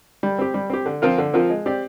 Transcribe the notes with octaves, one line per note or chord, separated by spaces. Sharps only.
G3
C4 G4
G3
C4 G4
D3
F3 C4 F4 A#4
D3
F3 C4 F4 A#4
G#3
C4 G4 D5